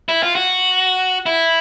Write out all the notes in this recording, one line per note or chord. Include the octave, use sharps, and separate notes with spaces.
E4
F4
F#4
E4